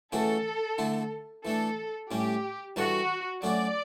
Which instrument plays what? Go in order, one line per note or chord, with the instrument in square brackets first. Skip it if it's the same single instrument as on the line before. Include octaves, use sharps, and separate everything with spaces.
[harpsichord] C#3 E3 A3 C#4 F#4 [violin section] A4
[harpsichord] D3 A3 E4
[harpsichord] E3 A3 D4 [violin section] A4
[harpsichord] A2 G3 C#4 [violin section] G4
[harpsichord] E3 G3 D4 A4 [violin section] F#4
[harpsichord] F#3 A3 C#4 F#4 [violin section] D5